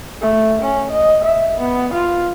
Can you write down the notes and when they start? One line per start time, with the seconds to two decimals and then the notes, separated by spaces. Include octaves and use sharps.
0.21 A3
0.62 C#4
0.91 D#5
1.25 E5
1.60 B3
1.94 F4